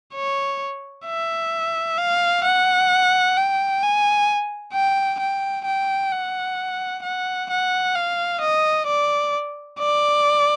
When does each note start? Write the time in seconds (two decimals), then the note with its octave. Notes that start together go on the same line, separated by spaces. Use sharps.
0.14 C#5
1.06 E5
1.98 F5
2.44 F#5
3.37 G5
3.83 G#5
4.74 G5
5.20 G5
5.65 G5
6.12 F#5
7.03 F#5
7.50 F#5
7.96 F5
8.41 D#5
8.87 D5
9.79 D5